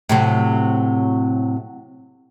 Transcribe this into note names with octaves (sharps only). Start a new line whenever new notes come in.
A2 C3 F#3